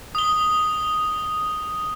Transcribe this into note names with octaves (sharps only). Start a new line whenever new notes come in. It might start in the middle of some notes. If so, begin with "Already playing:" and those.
D#6 G7